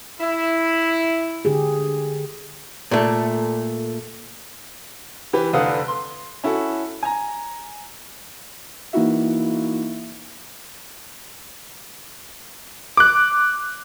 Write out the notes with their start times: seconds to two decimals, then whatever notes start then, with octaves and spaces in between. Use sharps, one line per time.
0.20 E4
1.45 D3 G4 G#4
2.91 A#2 A3
5.33 E3 G4 B4
5.53 F1 D3 B4 F5 F#5 D#6
5.88 C6
6.44 C#4 E4 F#4 A4
7.03 G#5 A#5
8.93 E3 A#3 D#4 E4 F#4 E5
12.97 D6 F#6